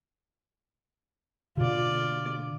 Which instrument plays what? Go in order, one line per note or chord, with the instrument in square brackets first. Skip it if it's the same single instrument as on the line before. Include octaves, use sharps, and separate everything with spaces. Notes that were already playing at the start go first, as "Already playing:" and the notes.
[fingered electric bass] B2 D3 [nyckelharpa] F4 D5